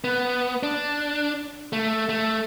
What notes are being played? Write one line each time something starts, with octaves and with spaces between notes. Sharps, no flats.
B3
D4
A3
A3